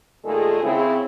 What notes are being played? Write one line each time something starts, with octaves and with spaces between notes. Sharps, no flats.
A#2 D#3 G#3 A3 G#4 A4
C#3 C4 E4